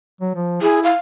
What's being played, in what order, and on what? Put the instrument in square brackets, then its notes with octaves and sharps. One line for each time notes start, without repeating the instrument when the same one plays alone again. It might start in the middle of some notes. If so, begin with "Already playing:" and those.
[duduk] F#3
F3
[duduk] E4 [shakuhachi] G#4
[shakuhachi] F5